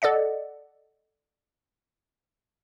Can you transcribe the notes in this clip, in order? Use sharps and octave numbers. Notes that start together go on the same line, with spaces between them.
A4 D5 D#5 F#5